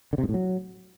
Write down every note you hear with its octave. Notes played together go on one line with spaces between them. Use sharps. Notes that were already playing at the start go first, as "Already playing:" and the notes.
D3
C3
G#2
A2
F#3